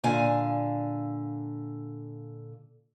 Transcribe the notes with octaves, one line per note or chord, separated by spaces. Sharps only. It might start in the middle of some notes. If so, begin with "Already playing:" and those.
A#2 D3 F5 G#5